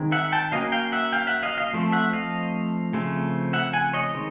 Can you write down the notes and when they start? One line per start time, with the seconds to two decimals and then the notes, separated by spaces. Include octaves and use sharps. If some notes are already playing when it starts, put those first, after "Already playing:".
Already playing: D#3 G#3 C4
0.12 E5 F#5
0.32 G5 A5
0.52 F#3 A#3 C#4 D#5 F5
0.72 F5 G5
0.92 E5 F#5
1.12 F5 G5
1.27 E5 F#5
1.43 D#5 F5
1.57 D#5 F5
1.73 F3 A3 C4
1.92 E5 F#5
2.13 D#5 F5
2.93 C#3 F3 A3 C4
3.53 E5 F#5
3.73 F#5 G#5
3.93 C#5 D#5
4.14 D#3 G#3 C4